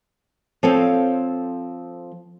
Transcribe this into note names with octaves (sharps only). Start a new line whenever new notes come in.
F3 C4 A4 C#5 F5